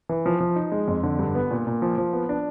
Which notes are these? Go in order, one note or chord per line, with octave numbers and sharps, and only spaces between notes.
E3
F3
F3
D#4
G#3
F2
D3
G2
B3
A#2
A#2
F3
F3
B3
D4